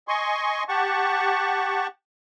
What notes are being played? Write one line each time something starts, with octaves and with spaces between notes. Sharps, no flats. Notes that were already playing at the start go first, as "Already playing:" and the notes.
D#5 G#5 C6 C#6
G4 F#5 A5 C#6